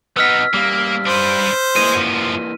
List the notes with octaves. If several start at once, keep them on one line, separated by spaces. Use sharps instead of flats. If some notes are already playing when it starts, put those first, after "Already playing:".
B3 D#4 B4 D#5 F#5 E6 F6 B6
G3 A#3 G4 F5
D4 B4 C5
A#3 E4 G#4 B4 D#5 D#7
F#2 F3